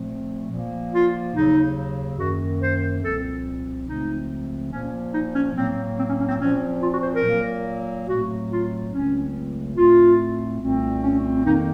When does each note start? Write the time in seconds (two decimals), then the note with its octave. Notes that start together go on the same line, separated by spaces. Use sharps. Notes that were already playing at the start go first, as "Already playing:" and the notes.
Already playing: A#2 F3 A3 C4
0.50 A#2 F3 A#3
0.93 F4
1.34 D#2 C#3 F#3 D#4
2.18 F#2 D#3 A#3 F#4
2.61 C5
3.03 C2 A#2 F3 C4 A4
3.87 C#2 C#3 F3 A3 C4 D#4
4.71 A#2 F3 A#3 C#4
5.13 D#4
5.35 C#4
5.55 A2 F#3 A#3 C4
5.98 C4
6.08 C#4
6.19 C#4
6.28 C4
6.39 A#2 F3 C4 C#4
6.82 F4
6.92 F#4
7.02 C5
7.13 A#4
7.23 A#2 F#3 A#3
8.08 A2 F#3 A3 C4 F#4
8.50 F4
8.92 C#2 C#3 F#3 A3 C4 C#4
9.76 A2 A3 C4 F4
10.60 C2 A#2 A3 C4
11.03 C#4
11.44 F2 D#3 A#3 D#4